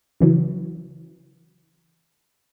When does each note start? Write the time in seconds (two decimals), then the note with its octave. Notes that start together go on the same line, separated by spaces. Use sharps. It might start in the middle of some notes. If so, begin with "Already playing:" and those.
0.21 C#3 E3 F#3